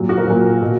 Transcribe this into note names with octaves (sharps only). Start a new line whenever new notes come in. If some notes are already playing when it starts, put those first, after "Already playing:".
Already playing: A#2 F#3
F#4
A#4
A#2 F#3
B2